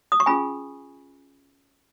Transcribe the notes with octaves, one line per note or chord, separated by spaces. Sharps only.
D#6
C#6
C#4 F4 G#4 G#5 B5